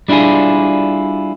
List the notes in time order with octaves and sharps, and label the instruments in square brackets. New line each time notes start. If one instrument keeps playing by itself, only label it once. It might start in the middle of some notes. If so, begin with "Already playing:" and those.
[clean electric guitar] G3 D4 E4 F4 G#4